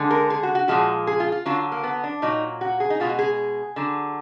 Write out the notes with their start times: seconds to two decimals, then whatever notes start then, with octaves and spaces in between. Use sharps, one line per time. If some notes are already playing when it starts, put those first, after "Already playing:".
Already playing: D3 G#3
0.11 A#4
0.30 G#4
0.43 F#4
0.55 F#4
0.68 A#2 F3 G#3 F#4
1.07 G#4
1.20 F4
1.32 F4
1.46 D3 F#3 F4
1.72 A#3
1.83 B3
2.04 D4
2.22 A#2 F#3 D#4
2.61 F#4
2.80 G#4
2.90 D#4
3.00 B2 G#3 F4
3.09 F#4
3.19 G#4
3.76 D3 F#3